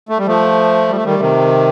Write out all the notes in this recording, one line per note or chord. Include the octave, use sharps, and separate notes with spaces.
A3
G3
F3 A3
G3
A3
D#3 G3
C3 D#3